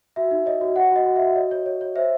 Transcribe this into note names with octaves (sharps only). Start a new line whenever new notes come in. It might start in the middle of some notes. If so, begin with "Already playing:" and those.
F#4 E5
D#4
C#5 D#5
F#4
F#4 F#5
F#4 D#5
F#4
E5
F#4
C#5 D#5
C#5
C#5
C#5
C5 E5